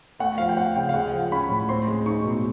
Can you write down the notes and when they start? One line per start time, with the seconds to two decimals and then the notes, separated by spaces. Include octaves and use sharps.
0.19 A3 F#5
0.38 F3 F5
0.49 G5
0.56 C4 F#5
0.76 C#3 G5
0.89 F5
0.94 G#3 F#5
1.13 F3 G5
1.32 C#4 B5
1.50 A2
1.69 C4 C6
1.88 G#3
2.06 D#4 C#6
2.24 B2